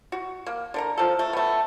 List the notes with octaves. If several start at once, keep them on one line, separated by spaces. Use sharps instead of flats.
F#4
A#3
D3 A#4 A#5
F3 A4
A3
A3 B3